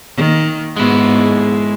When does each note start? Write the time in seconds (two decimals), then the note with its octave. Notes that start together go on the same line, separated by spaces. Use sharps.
0.17 D#3 A#3
0.77 G#2 G#3 B3 E4 F#4